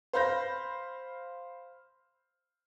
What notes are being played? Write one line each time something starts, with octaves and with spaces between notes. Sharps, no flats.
C5 F5 B5 G6 A#6